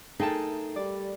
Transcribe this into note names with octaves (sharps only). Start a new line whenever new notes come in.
A3 D#4 G#4 A#4 G5 A5
G3 D5